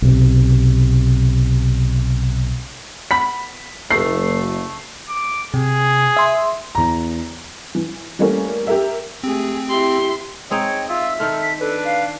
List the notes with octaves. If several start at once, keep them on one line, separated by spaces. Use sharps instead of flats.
B1 C3
B3 B5 B6
F#1 A3 C7
D6
C3 G#4
E5 C6
E2 A#5
E3
E3 G3 A3 A#3 C#4
G4 A#4 E5
A3 C4 G4 G#4
E4 G4 C6
G#3 C4 D#4 C#5 D#5 G5
F4 E5 E6
D#3 C4 A4 F6
B6
D4 A4 B4
F5